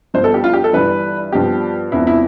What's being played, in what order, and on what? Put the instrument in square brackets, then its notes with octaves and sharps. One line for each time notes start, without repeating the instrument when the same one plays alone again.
[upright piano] G1 G2 F3 B3 C5
A4
G4
F4
G4
A4
G1 G2 E3 G3 B4
G2 F3 B3 G4
E1 E2 C3 F3 B3 E4
E4